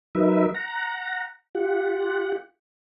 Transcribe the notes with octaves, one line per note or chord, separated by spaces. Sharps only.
F#3 D#4 A#4 B4 E5
F#5 A#5
F4 G4 F#5